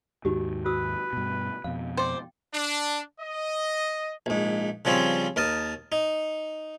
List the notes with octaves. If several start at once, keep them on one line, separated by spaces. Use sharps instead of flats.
D#2 G#2 D#4 F#4 G4
F#4 B4 D#6 E6
G2 B2
F2 B2 F5
C5 D5 G5
D4
D#5
A#1 G#2
C#3 F3 G3 C4 C#4
D#2 A#4 A5 D#6
D#4